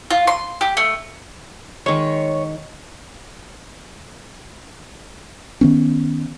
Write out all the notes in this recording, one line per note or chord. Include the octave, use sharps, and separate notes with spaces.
F4
C6
G4
A3
D#3 G#3 C#5
D#3 B3 C#4